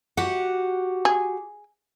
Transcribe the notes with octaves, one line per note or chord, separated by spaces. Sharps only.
F#4 G4 F#5
G#4